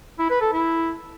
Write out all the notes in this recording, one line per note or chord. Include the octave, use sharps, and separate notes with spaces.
E4
B4
A4
E4